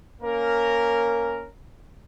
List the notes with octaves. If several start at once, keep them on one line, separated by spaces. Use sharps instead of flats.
A#3 C#4 A#4